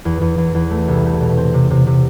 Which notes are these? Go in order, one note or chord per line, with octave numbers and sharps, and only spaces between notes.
E2
E2
E2
E2
A3
C2
A3
B2
C4
C3
C3
C3